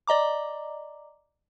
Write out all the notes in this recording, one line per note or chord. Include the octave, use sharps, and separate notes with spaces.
D5 D#5 A#5 D6